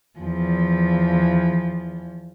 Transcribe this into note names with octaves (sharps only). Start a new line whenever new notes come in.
E2 F3